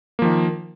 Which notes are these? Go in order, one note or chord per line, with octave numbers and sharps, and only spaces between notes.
D#3 F3 A#3